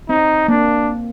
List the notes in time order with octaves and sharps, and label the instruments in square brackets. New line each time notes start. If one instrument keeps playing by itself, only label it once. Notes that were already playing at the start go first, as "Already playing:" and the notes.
[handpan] C4 [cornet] D#4
[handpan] A#3 [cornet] D4